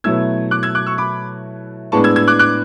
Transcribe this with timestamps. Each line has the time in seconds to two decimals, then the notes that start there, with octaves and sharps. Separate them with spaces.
0.04 B2 F#3 A3 E4 E6 G#6
0.51 D6 F#6
0.63 E6 G#6
0.75 D6 F#6
0.86 C#6 E6
0.98 B5 D6
1.92 A2 G#3 B3 D4 A5 C#6
2.04 E6 G#6
2.16 E6 G#6
2.28 D6 F#6
2.39 D6 F#6